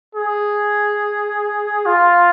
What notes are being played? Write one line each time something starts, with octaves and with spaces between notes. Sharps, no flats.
G#4
F4